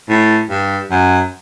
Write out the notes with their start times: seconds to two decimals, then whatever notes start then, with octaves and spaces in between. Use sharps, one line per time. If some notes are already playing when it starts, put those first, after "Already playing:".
0.09 A2
0.50 G2
0.91 F#2